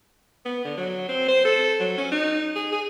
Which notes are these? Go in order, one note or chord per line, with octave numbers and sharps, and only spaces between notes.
B3
D3
F#3
C4
C5
A4
F#3
C#4
D#4
G#4
G#4